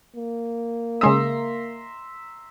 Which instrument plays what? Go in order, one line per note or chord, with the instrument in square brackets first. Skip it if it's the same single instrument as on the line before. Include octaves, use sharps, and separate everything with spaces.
[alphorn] A#3
[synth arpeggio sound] C#3 G#3 D#6 [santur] E5 A#5 C6